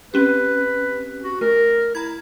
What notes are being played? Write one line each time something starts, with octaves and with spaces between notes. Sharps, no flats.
C4 C#4 G4 B4
F#4
A3 A#4
E4 A#5 G#6